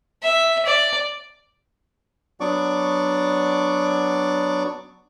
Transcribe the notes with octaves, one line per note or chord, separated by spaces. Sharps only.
E5
D5
F#3 B3 D4 D5 C#6 D6